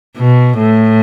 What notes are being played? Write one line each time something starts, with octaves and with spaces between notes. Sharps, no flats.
B2
A2